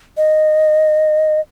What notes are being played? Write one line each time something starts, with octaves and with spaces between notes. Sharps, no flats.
D#5